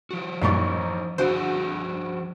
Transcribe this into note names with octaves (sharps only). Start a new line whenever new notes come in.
F3 F#4
A1 F#2 A#2 G3 D#4 C#6
G2 F3 F#4 G#4 C5 F#5 D7